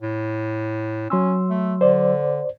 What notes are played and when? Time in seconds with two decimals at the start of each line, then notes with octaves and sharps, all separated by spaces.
0.02 A2
1.10 F#3 C#4 C6 E6
1.50 A3
1.81 D3 C5 D5